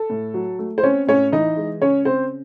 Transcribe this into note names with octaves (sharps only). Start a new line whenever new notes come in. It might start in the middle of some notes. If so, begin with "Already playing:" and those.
Already playing: A4
A2
F#3
A3
C5
C4 C#4 C#5
A2 C#4 C#5
E3 D#4 D#5
G#3
C#3 C#4 C#5
C#3 C4 C5